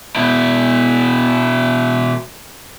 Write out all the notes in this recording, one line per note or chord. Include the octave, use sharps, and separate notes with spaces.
B2 E4